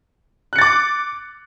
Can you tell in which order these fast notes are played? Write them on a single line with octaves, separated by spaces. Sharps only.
F#6 C#7 A6 D6